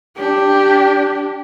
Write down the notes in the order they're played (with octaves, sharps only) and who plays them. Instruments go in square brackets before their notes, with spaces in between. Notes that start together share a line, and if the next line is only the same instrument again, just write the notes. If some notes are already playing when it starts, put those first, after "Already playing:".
[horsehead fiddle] D4 G4